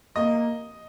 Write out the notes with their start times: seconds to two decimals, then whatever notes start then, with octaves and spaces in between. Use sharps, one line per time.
0.16 A#3 D#5